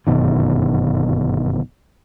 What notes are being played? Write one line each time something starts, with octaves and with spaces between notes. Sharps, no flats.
G1 F#2 B2 D#3